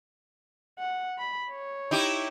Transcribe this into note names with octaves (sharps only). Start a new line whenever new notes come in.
F#5
B5
C#5
D#4 E4 G4